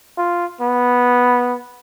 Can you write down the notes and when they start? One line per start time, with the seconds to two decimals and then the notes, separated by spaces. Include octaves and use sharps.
0.18 F4
0.61 B3